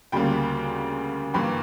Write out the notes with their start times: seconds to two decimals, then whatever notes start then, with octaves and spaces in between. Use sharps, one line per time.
0.12 D2 C#3 G3 A#3 G5 B5
1.34 G2 E3 A#3 G5 B5